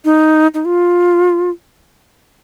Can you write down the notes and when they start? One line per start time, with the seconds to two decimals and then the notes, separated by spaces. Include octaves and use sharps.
0.05 D#4
0.54 D#4
0.65 F4